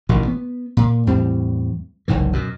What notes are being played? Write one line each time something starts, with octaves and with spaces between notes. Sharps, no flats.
A1 B2 D#3
B3
A#2
E2 A2 G3 C4
F#1 C2 G#2 E3
F#2 B2